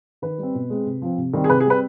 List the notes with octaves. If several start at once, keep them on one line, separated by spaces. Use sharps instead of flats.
D#3 B4
G3 C4
B2
G#3 C4
C3
F3 C4
C3
D#3 G3 C4
G#4
C3 B4
G#4
G3 C4 B4